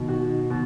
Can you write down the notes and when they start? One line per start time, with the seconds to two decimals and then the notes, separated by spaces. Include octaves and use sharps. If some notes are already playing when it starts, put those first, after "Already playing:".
Already playing: B2 D#3 D#4
0.08 F#4
0.50 B2